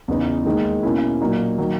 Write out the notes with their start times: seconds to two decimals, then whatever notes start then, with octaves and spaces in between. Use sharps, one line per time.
0.08 E2 C#3 E3 B3 D#4
0.45 D#2 D#3 G#3 D#4
0.83 B2 A#3 C#4 E4
1.21 A#2 F#3 A#3 D#4
1.58 D#3 F#3 A#3